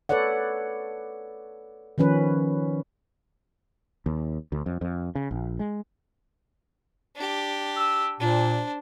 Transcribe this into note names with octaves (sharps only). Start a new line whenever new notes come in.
A4 B4 C#5 D5 F#5
D#3 F3 C#4 B4
D#2
D2
F2
F2
C#3
A#1
G#3
D4 G4
E6
A#2 D4 C5